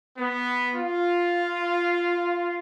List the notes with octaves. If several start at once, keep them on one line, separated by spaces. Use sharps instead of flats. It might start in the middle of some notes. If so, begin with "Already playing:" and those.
B3
F4